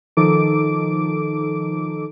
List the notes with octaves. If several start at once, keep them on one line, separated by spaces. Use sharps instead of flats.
D#3 F3 D#4 A4 D6 D7